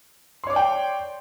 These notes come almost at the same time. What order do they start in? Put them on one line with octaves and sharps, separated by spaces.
C6 C#5 D6 D5 G5